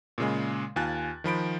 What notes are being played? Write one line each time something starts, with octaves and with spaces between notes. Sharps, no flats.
A#2 C#3 G#3
D#2 F4 G#5 F#6 A6
D#3 F3 B5 D7